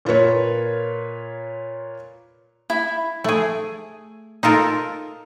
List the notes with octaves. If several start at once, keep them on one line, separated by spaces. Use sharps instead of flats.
A#2 F4 A#4 B4 C#5
E4
A3 G#4
D#4 F4 A4 A#4